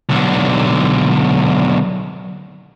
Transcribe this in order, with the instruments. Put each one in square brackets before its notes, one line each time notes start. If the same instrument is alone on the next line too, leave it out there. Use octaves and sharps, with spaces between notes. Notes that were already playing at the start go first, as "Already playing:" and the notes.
[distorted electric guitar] B1 D3